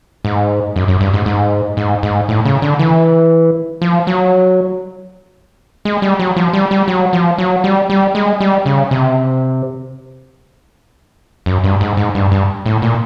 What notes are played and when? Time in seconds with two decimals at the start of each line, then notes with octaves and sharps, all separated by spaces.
0.25 G#2
0.76 F#2
0.88 F#2
1.01 G2
1.14 G#2
1.26 G#2
1.77 G#2
2.03 G#2
2.29 A2
2.45 C#3
2.62 D3
2.79 E3
3.82 F3
4.07 F#3
5.85 G#3
6.02 G3
6.19 F#3
6.36 F3
6.53 G3
6.71 G3
6.88 F#3
7.13 F3
7.38 F#3
7.64 G3
7.90 G3
8.15 G#3
8.40 G3
8.66 C#3
8.91 C3
11.46 F#2
11.64 G2
11.81 G#2
11.97 G#2
12.15 G2
12.32 G2
12.66 A2
12.82 A#2